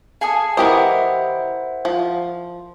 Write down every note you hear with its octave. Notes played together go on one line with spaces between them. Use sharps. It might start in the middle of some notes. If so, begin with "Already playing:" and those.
G#4 A4 F5 G#5 D#6
E3 E4 G4 A#4 C5 D#5 E5 F#5
F3